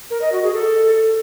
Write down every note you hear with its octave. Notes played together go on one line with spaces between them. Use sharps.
A#4
D#5
F#4
G#4
A4